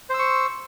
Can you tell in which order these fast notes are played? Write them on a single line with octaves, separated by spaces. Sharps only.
C5 E6 C#6